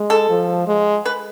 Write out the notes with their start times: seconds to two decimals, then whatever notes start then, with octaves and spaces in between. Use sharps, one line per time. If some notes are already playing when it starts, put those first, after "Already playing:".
Already playing: G#3
0.10 A4
0.29 F3
0.68 G#3
1.05 B4